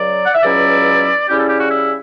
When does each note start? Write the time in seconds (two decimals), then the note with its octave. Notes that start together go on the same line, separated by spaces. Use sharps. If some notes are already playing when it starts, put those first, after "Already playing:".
Already playing: C#2 C#3 F#3 D5
0.26 F#5
0.35 E5
0.43 C#2 B2 F#3 C#4 E4 D5
1.28 C#3 G3 C#4 E4 G4
1.38 A4
1.49 G4
1.60 F#4
1.70 E4